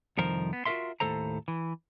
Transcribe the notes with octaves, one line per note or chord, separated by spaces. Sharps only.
C2 F2 D#3 F3 A#4 C5
B3
F4 F#4 G#4 A#4 E5 C6
D#2 A2 G#3 A4 C5 A#5
E3